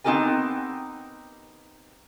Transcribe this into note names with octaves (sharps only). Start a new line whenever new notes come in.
B3 C4 D#4 G4 A#4 G#5